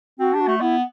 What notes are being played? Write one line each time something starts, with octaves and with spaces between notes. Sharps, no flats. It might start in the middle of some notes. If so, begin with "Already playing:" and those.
C4 F#4
D4 G4
F#4
A3
B3 E4